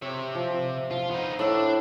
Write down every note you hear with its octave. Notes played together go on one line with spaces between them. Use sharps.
C3 C#5 E5
F3
F3 F4
B3 D#4
A2 D4 E5